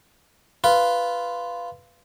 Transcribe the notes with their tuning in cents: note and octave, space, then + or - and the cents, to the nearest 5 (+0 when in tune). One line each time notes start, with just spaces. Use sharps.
F4 -10 B4 +0